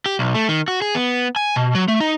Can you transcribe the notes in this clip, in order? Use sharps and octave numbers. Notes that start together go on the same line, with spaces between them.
G4
B1
A3
D#3
F#4
G#4
B3
G#5
B2
F#3
A3
D#4